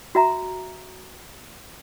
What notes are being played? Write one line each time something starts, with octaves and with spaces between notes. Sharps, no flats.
F#4 E5 A#5